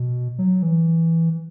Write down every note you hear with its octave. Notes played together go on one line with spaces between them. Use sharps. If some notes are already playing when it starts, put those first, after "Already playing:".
Already playing: B2
F#3
E3